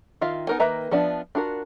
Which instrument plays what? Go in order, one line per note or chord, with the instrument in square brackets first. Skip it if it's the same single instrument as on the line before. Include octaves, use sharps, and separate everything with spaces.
[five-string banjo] D#3 F4 E5 F5
B3 D#4 A#4 C5 G#5
D#3 A#3 B4 E5 A#5
F3 B3 D4 E5
D4 F4 F#4 A#4